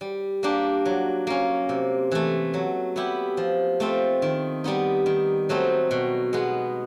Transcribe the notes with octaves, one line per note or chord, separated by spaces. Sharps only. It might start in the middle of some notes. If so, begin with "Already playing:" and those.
G3
A#3 D4 G4
F#3
A#3 C#4
C3
E3 A3
F#3
B3 E4 G4
F3
A3 C4 F4
D#3
G3 B3 D#4
D#3
F#3 A3 C4 D#4
B2
G#3 B3